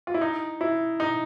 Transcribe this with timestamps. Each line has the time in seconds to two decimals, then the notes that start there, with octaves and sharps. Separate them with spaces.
0.07 F4
0.14 E4
0.21 D#4
0.61 E4
1.00 D#4